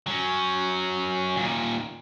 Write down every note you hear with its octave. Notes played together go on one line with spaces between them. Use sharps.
F#3 C#4
A#2 D#3